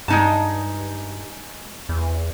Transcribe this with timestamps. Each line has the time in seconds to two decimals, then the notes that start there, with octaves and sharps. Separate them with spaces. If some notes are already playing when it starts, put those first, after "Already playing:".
0.08 G2 G#3 D#4 A5
1.89 E2